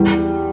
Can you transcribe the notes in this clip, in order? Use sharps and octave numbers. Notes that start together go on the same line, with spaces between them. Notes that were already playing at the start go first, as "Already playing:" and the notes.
Already playing: E2 E3 G3